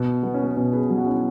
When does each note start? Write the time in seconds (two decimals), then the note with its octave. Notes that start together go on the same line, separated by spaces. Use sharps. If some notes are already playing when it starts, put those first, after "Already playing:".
Already playing: B2
0.23 F#3 B3
0.34 C#4
0.44 B3
0.57 B2 C#4
0.72 G#4 B4
0.90 F#3
0.98 F#4
1.06 C#4 E4